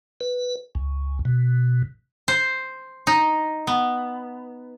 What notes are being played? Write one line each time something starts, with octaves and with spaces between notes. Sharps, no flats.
B4
C#2
B2
C5
D#4
B3